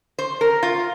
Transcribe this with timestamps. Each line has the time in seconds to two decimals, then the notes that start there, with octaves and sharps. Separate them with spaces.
0.19 C5
0.41 A#4
0.63 F4